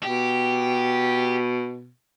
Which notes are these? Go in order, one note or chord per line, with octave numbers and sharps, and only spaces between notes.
B2 G4